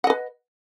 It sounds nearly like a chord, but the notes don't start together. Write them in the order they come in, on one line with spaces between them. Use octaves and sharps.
F#5 D#5 B4